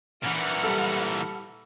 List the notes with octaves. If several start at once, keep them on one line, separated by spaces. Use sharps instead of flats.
A#2 E3 F#5 F6
G3 A4